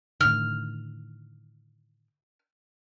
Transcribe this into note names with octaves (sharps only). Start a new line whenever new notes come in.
A2 D3 D#3 F6